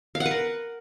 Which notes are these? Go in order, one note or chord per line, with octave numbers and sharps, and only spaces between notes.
F5
F#5
B4
A#4